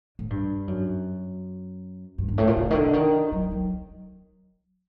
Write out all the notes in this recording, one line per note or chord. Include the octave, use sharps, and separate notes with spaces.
A2
G2
F#2
G2
G2
A2
A#2
C3
D#3
D3
D#3
F#3
F#3